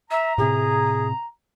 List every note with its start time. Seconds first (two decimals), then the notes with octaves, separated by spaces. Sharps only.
0.11 E5 A#5
0.38 A2 C3 G#4